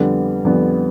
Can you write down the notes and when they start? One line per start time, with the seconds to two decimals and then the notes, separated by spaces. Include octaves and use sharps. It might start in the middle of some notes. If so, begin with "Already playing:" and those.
Already playing: F2 D3 G3 B3
0.45 F2 D3 G3 B3